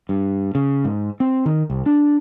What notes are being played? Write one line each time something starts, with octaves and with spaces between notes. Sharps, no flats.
G2
C#3
G#2
C4
D#3
C2
D4